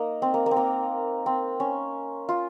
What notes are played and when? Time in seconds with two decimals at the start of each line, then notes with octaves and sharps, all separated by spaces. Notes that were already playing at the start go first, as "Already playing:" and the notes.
Already playing: A#3 D#4 A#4
0.22 C4
0.34 A#3
0.46 A#3
0.51 C4
0.57 A#3
1.26 C4
1.60 C#4
2.29 F4